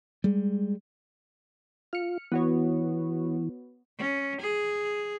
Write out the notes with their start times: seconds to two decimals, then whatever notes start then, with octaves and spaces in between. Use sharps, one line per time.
0.24 G3 G#3
1.93 F4 F6 C#7
2.32 E3 B3 F#4 C#5
3.98 C#4
4.40 G#4